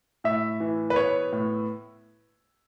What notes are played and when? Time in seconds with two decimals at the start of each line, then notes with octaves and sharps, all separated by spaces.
0.24 A2 E5
0.60 E3
0.90 B4
0.96 B3 C#5
1.32 A2